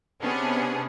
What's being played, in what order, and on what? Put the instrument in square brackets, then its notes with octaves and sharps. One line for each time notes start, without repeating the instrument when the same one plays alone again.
[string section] C3 B3 C#4 D4 G#4